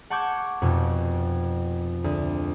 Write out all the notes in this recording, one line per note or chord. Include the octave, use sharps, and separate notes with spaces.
F#5 A5 C#6 D6 G6 G#6
F1 F2 B2
D2